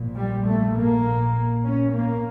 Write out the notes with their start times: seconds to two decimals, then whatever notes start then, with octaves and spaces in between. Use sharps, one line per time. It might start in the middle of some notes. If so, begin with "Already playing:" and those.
Already playing: A#1 A#2
0.16 G3
0.46 A3
0.76 A#3
1.64 C#4
1.93 A#3